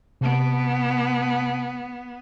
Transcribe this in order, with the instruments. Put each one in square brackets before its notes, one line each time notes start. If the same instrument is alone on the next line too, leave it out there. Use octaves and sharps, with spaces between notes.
[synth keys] C3 A5 D7 [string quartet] B3